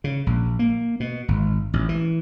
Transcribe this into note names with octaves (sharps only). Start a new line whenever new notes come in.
C#3
A#1
A#3
B2
G#1
A1
E3